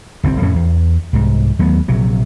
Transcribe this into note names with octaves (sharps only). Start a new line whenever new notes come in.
G1 C2 D3 C4
F2 A2 C#4
E2
C2 G#2
D#2 F#3 A3 B3
A#1 C3 F#3